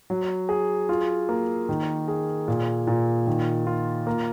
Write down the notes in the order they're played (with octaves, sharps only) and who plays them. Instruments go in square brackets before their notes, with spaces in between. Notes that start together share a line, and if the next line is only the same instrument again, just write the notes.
[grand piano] F#3
G#4
F4
A#3
D#3
G#4
A#2
A#2
D#3
F4
A#3